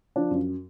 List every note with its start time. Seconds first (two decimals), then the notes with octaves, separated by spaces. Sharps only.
0.16 F3 D4
0.31 F#2